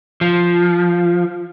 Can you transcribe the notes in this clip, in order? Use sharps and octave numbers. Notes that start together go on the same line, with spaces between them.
F3